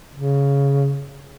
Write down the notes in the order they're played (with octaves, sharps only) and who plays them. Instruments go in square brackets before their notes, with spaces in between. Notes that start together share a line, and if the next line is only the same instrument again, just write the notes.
[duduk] C#3